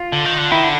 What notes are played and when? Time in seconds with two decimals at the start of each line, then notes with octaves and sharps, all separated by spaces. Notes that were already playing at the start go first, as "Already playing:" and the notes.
Already playing: F4
0.12 D3
0.25 D#3
0.38 D3
0.51 D#3 E4
0.64 D3